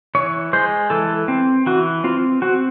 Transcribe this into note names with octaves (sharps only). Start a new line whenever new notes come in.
E3 C#5
G#3 C5
E3 A4
C4
E3 F#4
C4 F4
C4 F#4